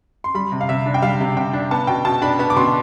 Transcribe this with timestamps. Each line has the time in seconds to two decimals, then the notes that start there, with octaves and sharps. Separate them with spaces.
0.24 C6
0.34 G3 B5
0.52 C3
0.61 F5
0.69 C3 E5
0.86 D4
0.94 G5
1.02 G3 F5
1.20 C3
1.37 C3 G5
1.53 D4
1.71 B3 A5
1.87 B2 G5
2.04 B2 A5
2.22 D4 B5
2.39 B3 B5
2.50 D6
2.56 B2 C6